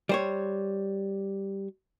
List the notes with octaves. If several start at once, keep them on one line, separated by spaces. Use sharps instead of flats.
G3 C5 C#5